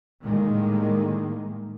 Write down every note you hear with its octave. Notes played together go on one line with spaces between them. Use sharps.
A2 D#3 G3 G#3 A#3